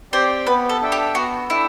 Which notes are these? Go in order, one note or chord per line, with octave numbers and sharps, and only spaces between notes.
C4 G4 C5 D5 G5
B3 B4
A4
D4 A4 E5 G5
G4
B3 F#4
D4 E4 A4 E5 G5